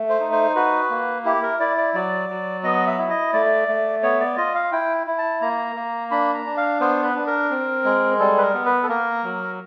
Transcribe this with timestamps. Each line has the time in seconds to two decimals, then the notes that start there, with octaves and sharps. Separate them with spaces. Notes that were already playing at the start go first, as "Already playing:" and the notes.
Already playing: A3
0.09 C5
0.20 D#4
0.32 C5
0.56 F#4 B4
0.90 A#3
1.25 E4 G4
1.43 A#4
1.60 E4 D5
1.77 D5
1.94 F#3 D5
2.29 F#3
2.63 B3 D#5
2.87 E5
2.98 E4
3.10 D#5
3.33 A3 D5
3.68 A3
4.03 B3 C#5
4.20 D5
4.37 F4 D#5
4.55 F5
4.72 E4 G5
5.07 E4
5.18 A5
5.41 A#3 A#5
5.76 A#3
6.11 D4 B5
6.34 A#5
6.46 D4
6.57 F5
6.80 B3 C5
7.03 B4
7.16 D4
7.27 A#4
7.50 C4
7.85 G#3
8.19 G3 A4
8.38 B4
8.42 A#4
8.54 B3
8.66 B4
8.83 A4
8.89 A#3 A#4
9.24 F#3